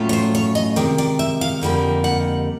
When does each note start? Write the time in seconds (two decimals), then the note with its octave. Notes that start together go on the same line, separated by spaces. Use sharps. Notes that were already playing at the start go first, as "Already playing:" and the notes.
Already playing: A2 F#3 A3 C#4 F4
0.09 C#5
0.13 C5
0.35 C#5
0.55 D#5
0.76 C3 D#3 G#3 D5
0.98 D5
1.19 E5
1.41 F5
1.61 F2 D3 G3 A#3 D#4
2.04 F#5